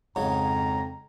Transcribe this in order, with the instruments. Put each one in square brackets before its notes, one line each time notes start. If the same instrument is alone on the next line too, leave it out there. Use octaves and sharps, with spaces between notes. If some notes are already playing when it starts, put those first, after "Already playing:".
[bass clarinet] F2 [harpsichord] G#2 C#3 F#3 [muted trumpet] A#5